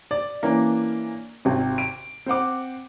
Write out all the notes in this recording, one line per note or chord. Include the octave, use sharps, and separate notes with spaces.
D5
E3 A#3 C#4 D4
G#1 C3
D7
C4 C5 F#5 D6